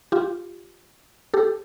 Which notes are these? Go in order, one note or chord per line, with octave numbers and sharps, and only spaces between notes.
F4 G4
G4 A4